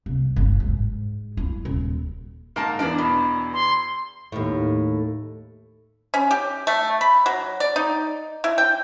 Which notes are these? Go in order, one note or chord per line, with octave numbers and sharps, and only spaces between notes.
C2
G1
G#2
E4
D#1
G#2 A#3 A#4 A5
E2 E3 D4 D5 D7
B2
C6
D#2 A2
C#4
G4
A3
B5
F#3
D5
D#4
E4
G5